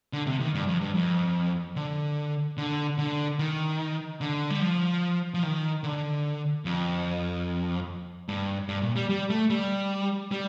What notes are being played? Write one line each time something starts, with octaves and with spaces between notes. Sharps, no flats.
D3
C3
D#3
G2
F2
G2
F2
D3
D3
D3
D#3
D3
G3
F3
F3
D#3
D3
F2
G2
G2
A#2
G3
G3
A3
G3
G3